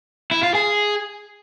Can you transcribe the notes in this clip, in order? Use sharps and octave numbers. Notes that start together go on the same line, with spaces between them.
E4
F4
G#4